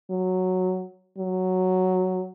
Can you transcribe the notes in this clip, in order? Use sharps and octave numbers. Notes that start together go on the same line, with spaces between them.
F#3
F#3